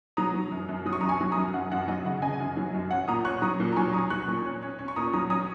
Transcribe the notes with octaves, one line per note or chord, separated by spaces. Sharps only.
F#3 A#5 D#6
F#3
F#2
F#2
F#3 D#6
C#6
F#2 A#5 D#6
G#5 C#6
F#3
A#5 D#6
F#2
F#2 F#5
F#2 F#5
F#3 D#5
C#3 F#5
C#3 D#5 G#5
F#2
F#3
F#2
C#4 F#5
A#2 A#5 D#6
C#4 C#6 F#6
F#3 A#5 D#6
A#2
A#5
F#3 G#5 C#6
C#4 A#5 D#6
F#3 C#6 F#6
A#2
C#4
C#4
C#4
C#6
A#2 A#5 D#6
F#3 A#5 D#6
C#4 A#5 D#6